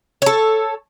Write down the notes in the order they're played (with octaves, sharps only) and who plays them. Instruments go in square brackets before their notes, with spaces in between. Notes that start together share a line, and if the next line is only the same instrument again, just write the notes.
[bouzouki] A4 C#5